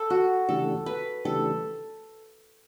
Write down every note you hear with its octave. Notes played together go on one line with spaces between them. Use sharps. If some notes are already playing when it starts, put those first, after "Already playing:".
Already playing: A4
F#4
C#3 E3 A3 D4 G4 A4
B4
C#3 E3 A3 D4 G4 A4